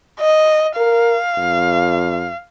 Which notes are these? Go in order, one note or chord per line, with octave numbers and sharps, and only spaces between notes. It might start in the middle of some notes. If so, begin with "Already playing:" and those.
D#5
A#4 F5
F2